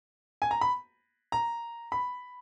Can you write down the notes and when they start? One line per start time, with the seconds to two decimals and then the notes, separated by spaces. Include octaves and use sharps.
0.42 G#5
0.51 A#5
0.61 B5
1.32 A#5
1.92 B5